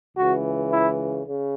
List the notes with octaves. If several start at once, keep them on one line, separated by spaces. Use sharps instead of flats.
C#2 C#3 E3 F#4
E4
C#3